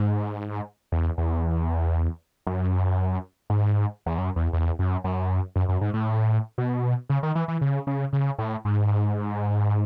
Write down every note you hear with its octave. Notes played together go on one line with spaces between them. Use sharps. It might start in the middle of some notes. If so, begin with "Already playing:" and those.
Already playing: G#2
E2
E2
F#2
G#2
E2
F#2
E2
E2
F#2
F#2
F#2
F#2
G#2
A2
B2
C#3
D#3
E3
E3
C#3
C#3
C#3
A2
G#2